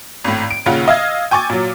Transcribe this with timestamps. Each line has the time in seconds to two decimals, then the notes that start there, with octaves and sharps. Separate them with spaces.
0.24 G#1 A2
0.51 D7
0.66 A#1 D#2 C#3 F4 F#5
0.88 D#5 F5 E6 G#6
1.31 G5 G#5 C#6 D6 A6
1.50 A#2 F#3